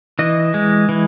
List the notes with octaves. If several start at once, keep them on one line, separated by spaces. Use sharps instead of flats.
E3 D#5
G#3
E3